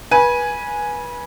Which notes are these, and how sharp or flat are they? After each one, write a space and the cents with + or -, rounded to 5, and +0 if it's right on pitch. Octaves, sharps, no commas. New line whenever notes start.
B4 -25 G#5 +0